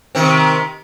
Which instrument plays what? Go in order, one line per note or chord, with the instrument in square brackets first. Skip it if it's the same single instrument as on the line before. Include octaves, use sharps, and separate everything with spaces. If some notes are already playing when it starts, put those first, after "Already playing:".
[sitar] C3 D#3 C4